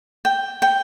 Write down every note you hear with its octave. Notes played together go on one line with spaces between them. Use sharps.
G5
G5